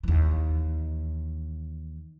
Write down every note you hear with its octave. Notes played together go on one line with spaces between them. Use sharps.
D#2 E3